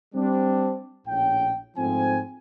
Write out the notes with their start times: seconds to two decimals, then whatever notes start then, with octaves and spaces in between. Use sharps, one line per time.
0.15 G3 C4 D4
1.07 A#1 A2 C#4 G5
1.77 G#2 F3 A3 C4 G#5